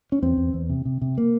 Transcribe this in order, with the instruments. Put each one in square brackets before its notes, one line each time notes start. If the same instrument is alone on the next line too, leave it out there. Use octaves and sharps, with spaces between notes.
[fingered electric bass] C#4
E2 C4
E2
E2
C3
C3
C3
A#3